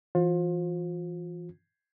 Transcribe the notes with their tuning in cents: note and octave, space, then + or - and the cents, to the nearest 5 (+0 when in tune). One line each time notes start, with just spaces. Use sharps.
E3 +20 F4 +35 C5 +25